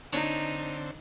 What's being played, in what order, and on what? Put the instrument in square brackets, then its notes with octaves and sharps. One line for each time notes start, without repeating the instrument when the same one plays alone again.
[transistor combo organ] D3 C4 [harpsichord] D4 C#5 [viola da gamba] D#4